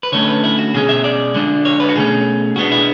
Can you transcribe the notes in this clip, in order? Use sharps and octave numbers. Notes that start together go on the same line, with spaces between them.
B4
D3 A3 C#4 C#5
B4
E4
F#4
B2 G#3 C#4 G#4
E5
D5
D3 G#3 D4
C#5
B4
F#4
B2 A3 C#4 G#4
B2 G#3 B3 D4 F#4
E4